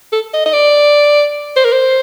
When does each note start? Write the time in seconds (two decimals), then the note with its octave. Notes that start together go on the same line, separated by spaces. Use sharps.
0.12 A4
0.33 D#5
0.45 D#5
0.53 D5
1.56 C5
1.64 A#4
1.72 C5